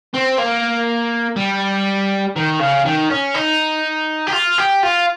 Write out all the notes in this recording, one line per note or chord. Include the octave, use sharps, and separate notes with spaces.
C4
A#3
G3
D#3
C#3
D#3
C#4
D#4
G4
F4
G4
F4